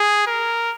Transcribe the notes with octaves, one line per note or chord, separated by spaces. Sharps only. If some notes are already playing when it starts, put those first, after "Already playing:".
Already playing: G#4
A#4